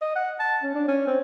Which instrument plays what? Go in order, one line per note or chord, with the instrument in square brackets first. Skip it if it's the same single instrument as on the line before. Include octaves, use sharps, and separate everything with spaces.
[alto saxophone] D#5
F#5
A5
C#4
D4
C#4
C4